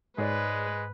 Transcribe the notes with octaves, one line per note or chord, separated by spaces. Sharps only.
G#2 G#3 G#4 B4 C#5 D5